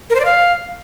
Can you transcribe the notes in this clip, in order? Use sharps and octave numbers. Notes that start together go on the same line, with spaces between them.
A#4
C5
D5
F5